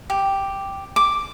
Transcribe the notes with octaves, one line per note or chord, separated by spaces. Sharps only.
G4
D6